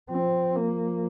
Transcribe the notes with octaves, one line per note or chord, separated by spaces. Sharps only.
F3 C4
A#3